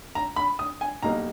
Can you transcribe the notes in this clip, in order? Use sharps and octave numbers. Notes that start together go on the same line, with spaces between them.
A#5
B5
D#6
G#5
B1 B2 G3 A#3 D#4 A#5